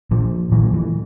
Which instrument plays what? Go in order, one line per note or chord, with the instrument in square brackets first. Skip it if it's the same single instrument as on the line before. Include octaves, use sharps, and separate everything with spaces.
[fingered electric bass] A#2 F3
A#2 E3
F3
E3